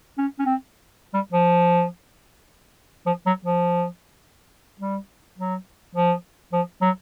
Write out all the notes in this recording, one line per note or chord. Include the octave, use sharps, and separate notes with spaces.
C#4
C#4
C4
G3
F3
F3
F#3
F3
G3
F#3
F3
F3
F#3